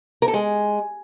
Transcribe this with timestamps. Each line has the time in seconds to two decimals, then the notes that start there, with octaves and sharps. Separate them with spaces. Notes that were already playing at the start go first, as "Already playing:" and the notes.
0.22 A#4
0.28 A4
0.34 G#3